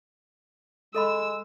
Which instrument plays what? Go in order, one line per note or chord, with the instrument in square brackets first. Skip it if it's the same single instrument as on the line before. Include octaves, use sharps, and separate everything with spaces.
[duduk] G#3 [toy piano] A4 D#5 B5 [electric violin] E6